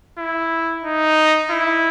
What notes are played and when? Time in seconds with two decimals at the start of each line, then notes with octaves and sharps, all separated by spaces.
0.18 E4
0.84 D#4
1.51 E4